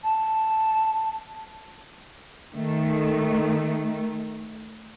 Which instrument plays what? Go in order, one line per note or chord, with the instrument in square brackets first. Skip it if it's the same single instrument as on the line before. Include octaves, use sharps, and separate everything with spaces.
[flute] A5
[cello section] D#3 A3